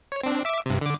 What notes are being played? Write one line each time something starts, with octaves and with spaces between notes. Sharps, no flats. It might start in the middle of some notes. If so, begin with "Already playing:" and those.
C#5
C4 D4
E5 D6
G2 C3
D3 D6